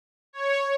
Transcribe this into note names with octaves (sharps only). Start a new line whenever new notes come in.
C#5